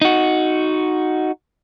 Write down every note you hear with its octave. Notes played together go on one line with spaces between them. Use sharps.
D#4 F#4